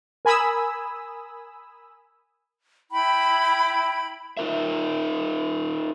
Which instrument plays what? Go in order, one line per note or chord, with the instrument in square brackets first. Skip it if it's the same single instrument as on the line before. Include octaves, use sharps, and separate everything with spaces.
[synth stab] A#4 G#5 B5 D#6 E6
[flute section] E4 G5 B5
[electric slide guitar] D#4 F4 A#4 E5